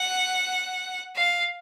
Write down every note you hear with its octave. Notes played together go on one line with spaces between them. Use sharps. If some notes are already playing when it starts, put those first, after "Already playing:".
Already playing: F#5
F5